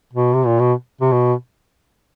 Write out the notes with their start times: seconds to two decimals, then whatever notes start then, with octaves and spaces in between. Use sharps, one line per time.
0.13 B2
0.34 C3
0.46 A#2
0.59 B2
1.01 C3
1.12 B2